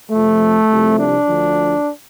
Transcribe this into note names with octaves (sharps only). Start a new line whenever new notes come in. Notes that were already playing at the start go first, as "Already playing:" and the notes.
F2 C3 F3 A3
C2 C3 F3
D4
D2 D3 F3